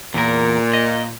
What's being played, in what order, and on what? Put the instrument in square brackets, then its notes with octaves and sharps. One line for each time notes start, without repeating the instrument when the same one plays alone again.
[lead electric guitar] E2 A#4 [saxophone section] A#2
[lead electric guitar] D#5